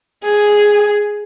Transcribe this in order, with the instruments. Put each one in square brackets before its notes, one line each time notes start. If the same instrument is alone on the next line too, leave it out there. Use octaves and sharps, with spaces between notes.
[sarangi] G#4